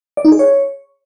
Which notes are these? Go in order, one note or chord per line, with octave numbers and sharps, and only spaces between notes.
D5
D#4
G#4
C#5